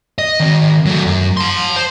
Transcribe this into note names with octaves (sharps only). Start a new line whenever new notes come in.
D#5
D#3 C4
F#3 A3
F#2
A5 C6
C5